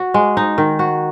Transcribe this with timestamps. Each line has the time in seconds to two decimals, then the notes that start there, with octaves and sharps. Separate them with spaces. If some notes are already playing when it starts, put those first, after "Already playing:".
Already playing: F#4
0.14 G#3
0.37 D#4
0.58 D#3
0.79 F#4